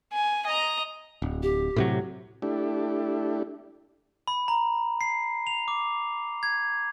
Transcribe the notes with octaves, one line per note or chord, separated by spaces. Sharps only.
G#5
D#5 A#5
D1
G4
A2 C3 F#3
A3 D4 E4 G4
B5
A#5
C7
F7
D6
G#6